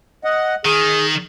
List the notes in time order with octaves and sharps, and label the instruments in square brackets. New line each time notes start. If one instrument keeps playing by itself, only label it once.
[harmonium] D#5 F#5
[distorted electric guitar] D#3 [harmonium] G#4